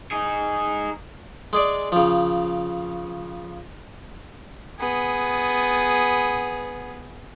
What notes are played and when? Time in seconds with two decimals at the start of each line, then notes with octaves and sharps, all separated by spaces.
0.11 D#4 G#4
1.53 G#3 G#4 D5
1.92 C#3 F3
4.80 B3 G#4